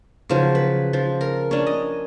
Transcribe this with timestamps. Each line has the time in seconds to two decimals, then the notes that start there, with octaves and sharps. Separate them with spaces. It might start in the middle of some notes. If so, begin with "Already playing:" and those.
0.30 C#3 F3 F#3
0.55 B4
0.93 F3
1.21 A#4
1.51 C#4 D4
1.67 D#5